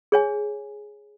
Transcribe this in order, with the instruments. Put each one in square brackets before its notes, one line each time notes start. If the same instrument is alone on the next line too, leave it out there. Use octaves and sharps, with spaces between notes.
[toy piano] G#4 C#5 G#5